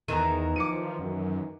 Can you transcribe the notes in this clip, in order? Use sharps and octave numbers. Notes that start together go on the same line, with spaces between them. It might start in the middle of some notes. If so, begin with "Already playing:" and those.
E2 D#3 E3 A#5 D#7
F3 D6 C#7 D#7
F#2